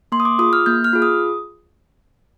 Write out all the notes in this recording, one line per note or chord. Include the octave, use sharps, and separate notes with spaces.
A#3 C6
D#6
D6
F4 G#4 D#6
F6
A#3 G6
F6
F4 G#4
D#6